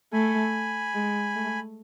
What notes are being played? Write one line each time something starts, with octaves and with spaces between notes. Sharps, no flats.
A3 G#5 B5
G#3
A3